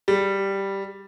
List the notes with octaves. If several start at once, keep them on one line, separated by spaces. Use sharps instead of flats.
G3